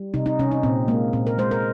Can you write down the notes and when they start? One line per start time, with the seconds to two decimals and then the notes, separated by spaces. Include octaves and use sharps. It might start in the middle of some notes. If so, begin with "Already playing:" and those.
Already playing: G3
0.14 C3 D#4
0.26 D#4
0.39 C3 C#4
0.51 D#4
0.63 A#2 C4
0.88 G#3 A#3
1.13 A#2 C4
1.27 A#4
1.38 G#3 C5
1.51 A#4